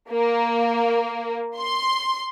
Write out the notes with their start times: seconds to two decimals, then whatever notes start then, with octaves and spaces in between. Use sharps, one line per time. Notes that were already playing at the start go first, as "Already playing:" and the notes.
0.11 A#3
1.58 C6